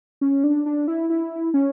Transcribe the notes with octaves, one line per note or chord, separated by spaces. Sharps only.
C#4
D4
D4
E4
E4
C#4